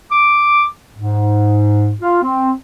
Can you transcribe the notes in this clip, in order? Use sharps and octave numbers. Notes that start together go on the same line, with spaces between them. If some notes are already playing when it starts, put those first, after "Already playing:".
D6
G#2
F4
C4